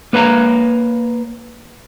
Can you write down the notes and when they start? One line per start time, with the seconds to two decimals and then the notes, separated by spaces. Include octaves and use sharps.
0.13 A#3 B4 C#5 F5 A#5